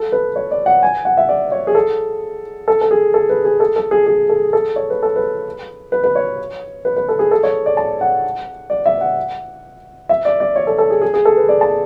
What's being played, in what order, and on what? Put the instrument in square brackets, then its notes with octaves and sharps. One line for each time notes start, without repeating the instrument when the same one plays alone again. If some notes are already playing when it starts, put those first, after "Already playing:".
Already playing: [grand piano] A4
B4
C#5
D5
F#5
G#5
F#5
E5
D5
C#5
G#4
A4
A4
A4
G#4
A4
B4
G#4
A4
A4
G#4
G#4
A4
A4
C#5
B4
A4
B4
B4
B4
C#5
B4
B4
A4
G#4
A4
C#5
D5
A5
F#5
D5
E5
F#5
E5
D5
D5
C#5
A4
A4
G#4
G#4
G#4
A4
B4
D5
A5